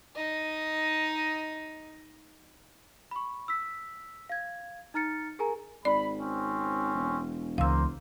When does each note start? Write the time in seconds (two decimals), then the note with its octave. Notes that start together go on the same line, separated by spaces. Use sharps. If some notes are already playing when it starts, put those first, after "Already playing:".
0.16 D#4 D#5
3.11 B5 C#6
3.48 E6 B6
4.29 F5 G#6
4.94 D#4 A#5 F6 A6 C#7
5.39 G#4 A#4 G#5 A#5
5.85 G#1 D5 B5
6.20 C4 C#4
6.95 E1
7.58 C#2 E3 G#3 A#3 C5 F5 E6